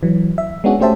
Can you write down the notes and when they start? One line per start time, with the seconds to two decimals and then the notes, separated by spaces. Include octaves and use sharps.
0.03 E3 F#3
0.38 E5
0.64 G#3 B3 C#4 D4 F#4 G#4
0.80 A3 C#4 G4 C5 E5 A5